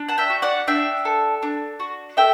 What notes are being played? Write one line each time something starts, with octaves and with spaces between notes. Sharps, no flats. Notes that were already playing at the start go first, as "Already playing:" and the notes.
Already playing: D4
F#5 A5
E5 G5
F#4
D5 F#5
D4 E5 G5
A4
D4
F#4
A4 E5 G5